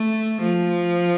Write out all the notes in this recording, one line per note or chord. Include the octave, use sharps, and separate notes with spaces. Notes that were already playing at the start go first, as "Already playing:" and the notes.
Already playing: A3
F3